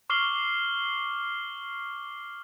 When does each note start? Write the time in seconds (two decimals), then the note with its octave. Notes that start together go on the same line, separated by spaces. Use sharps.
0.10 C#6 D6 F6 C7 F#7 G7